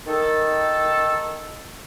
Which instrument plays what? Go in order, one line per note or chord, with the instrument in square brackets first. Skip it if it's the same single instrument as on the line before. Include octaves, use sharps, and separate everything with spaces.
[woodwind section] D#3 A4